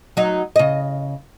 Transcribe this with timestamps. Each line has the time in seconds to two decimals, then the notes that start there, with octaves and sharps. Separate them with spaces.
0.17 F#3 D#4
0.56 C#3 D#5